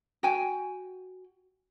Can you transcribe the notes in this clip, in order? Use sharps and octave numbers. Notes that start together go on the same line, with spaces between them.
F#4 G5 G#5